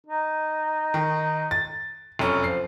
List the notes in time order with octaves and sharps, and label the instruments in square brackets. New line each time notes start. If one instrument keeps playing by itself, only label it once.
[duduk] D#4
[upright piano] D#3
A6
F1 F#2 C#4
[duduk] F3 [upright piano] C7